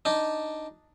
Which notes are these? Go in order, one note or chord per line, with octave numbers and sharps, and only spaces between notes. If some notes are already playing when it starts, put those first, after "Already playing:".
D4 D#4